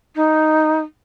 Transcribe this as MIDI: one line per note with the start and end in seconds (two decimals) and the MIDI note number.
0.15 0.80 63